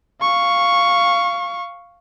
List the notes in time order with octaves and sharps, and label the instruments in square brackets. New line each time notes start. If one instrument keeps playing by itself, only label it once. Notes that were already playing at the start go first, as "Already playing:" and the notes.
[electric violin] F5 C#6